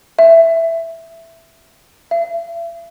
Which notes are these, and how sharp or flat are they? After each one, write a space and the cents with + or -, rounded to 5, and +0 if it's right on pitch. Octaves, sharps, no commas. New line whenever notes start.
E5 +5
E5 +40